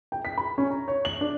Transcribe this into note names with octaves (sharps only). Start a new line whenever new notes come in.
G5
B6
B5
C#4
A#5
C#5
F#7
D4